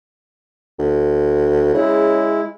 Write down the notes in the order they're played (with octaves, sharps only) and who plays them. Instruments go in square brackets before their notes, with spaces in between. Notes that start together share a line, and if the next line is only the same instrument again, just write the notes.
[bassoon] D2
[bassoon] C#3 [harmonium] G#3 E4